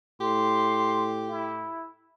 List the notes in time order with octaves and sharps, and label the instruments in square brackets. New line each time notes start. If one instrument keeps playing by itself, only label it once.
[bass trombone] A2 [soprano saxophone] G4 [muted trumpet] C6
[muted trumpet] E4